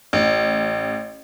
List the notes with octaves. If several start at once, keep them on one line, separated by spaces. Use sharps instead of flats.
A1